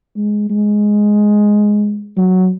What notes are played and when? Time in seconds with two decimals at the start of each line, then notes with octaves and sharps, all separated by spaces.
0.16 G#3
0.50 G#3
2.17 F#3